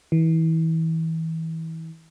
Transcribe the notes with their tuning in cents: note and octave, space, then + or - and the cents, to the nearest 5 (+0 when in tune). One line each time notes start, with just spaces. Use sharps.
E3 -30